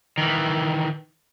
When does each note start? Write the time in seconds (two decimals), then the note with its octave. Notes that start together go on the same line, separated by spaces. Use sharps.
0.18 D#3 E3